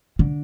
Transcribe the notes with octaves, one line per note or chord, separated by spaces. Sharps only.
D3